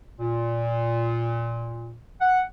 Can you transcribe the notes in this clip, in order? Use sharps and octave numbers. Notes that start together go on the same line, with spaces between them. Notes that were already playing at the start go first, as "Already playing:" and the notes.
A#2
F#5